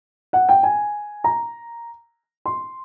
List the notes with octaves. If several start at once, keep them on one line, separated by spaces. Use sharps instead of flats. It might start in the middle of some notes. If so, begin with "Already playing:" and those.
F#5
G5
G#5
A#5
C6